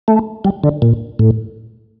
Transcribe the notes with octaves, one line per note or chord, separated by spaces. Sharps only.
A3
G3
D3
A#2
A2